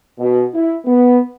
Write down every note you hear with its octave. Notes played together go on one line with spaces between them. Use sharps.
B2
E4
B3